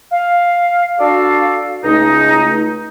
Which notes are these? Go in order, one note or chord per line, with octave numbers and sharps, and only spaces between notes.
F5
D4 F#4 A4 D5 F5
C#2 A3 D#4